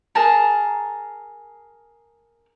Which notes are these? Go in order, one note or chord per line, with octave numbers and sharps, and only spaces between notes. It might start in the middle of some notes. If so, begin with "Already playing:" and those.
G#4 A#4 A5 A#5